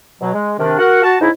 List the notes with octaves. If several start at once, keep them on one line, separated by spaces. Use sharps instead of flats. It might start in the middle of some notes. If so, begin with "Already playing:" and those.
B2 F#3
G#3
C3 D#3 D4
F#4 A#4 F#5
F#4 A5
G#2 C#3 D#4 E4